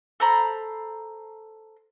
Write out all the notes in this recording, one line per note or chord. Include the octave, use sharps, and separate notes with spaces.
A4 C5 A#5 B5